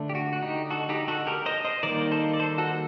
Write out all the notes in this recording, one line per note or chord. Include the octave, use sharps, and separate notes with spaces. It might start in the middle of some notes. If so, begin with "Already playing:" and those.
Already playing: D3 A3 D4
G4
F#4
F#4
D#4 G4
F#4 A4
D#4 G4
F#4 A4
G4 A#4
C5 D#5
C5 D#5
D#3 G3 A#3 D#4 A#4 D5
A4 C5
D5
A4 C5
F#4 A4